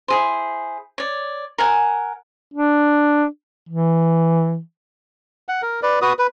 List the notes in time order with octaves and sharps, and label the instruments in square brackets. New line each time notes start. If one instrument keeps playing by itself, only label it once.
[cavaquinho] E4 G#4 C5
C#5 D5
A#4 F#5 G#5
[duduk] D4
E3
[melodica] F#5
A#4
B4 D5
F#4 B4 D#6
B4